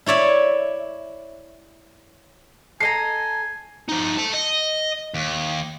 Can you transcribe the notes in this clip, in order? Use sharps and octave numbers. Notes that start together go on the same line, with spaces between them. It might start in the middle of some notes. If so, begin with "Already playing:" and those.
E4 C#5 D5 E5
A4 D#5 G#5 A#5 C7
F3 D#4
E5 A5
D#5
D#2